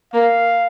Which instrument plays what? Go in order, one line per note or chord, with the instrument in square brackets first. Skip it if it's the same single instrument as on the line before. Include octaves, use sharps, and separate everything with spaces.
[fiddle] A#3 [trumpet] F5